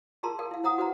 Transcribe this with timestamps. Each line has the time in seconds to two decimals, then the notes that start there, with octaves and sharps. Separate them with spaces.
0.23 F4 G#4 A#4 A5 A#5 C6
0.39 A4 A#4 F5 G5
0.51 E4 F5
0.63 E4 C5 F#5 A#5 D#6
0.78 F#4 B4 C5 F#5 A#5